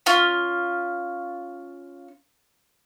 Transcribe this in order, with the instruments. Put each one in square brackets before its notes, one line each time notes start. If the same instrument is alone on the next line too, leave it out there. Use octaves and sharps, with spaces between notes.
[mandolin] C#4 F4